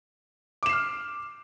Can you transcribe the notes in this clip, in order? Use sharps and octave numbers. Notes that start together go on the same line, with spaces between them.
D6 F6 C7 E7